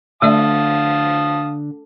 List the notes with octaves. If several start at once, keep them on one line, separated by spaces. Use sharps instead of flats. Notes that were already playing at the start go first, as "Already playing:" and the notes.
D3 A3 D5 E5 F5 A5 D#6